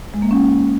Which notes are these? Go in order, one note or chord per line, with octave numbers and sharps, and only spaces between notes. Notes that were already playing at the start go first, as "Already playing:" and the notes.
G#3
A#3
C#4